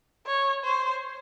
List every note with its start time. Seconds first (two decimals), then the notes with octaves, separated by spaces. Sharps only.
0.27 C#5
0.64 C5